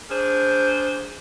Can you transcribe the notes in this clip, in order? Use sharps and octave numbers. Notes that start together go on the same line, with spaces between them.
D4 G#4 A#4 C5